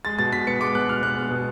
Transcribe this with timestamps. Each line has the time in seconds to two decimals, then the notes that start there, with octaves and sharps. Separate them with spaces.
0.05 G#3 A6
0.19 B2 A6
0.33 B2 B6
0.47 B3 C#7
0.61 G#3 D6
0.75 B2 F#6
0.89 B2 F6
1.03 B3 F#6
1.17 G#3
1.31 B2